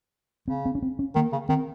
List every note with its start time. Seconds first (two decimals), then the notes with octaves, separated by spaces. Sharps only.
0.48 C#3 C4
0.65 C4
0.75 C#4
0.82 C4
0.99 C#4
1.15 D#3 A#3
1.32 C#3
1.49 D#3 C4